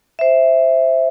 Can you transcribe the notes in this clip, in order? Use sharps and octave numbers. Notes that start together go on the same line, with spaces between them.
C5 E5